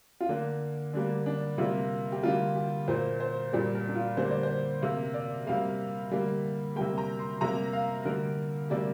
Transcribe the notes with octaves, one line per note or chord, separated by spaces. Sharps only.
F4
D3 A#3 D4
D3 G3 A#3 D4
D4
C3 G3 A#3 F4
G4
D3 G3 A#3 F4
G4
A#2 A#3 C5
C5
A#2 G3 A#3 D5
A#4
D4
F4
D3 G3 A#3 C5
D5
C5
C3 A#3 F5
D5
C3 G3 A#3 F5
D3 G3 A#3
C3 G3 A#3 G5
A#5
C6
C3 G3 A#3 A#5
F5
D3 G3 A#3 A#4
C3 G3 A#3 D5